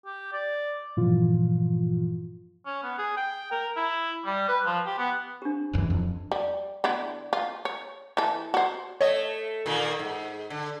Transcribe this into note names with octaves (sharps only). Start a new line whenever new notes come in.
G4
D5
G2 A#2 E3 F3 F4
C#4
B3
G#4
G5
A#4
E4
G3
B4
F3
G4
B3
D4 G4
D1 F#2 E3
F2
G3
D3 B3 E4
F4
C#5
E3 A4
F#4 C5
A3 C#5 D#5 G#6
A#2 D#3 A#3
G#2
D3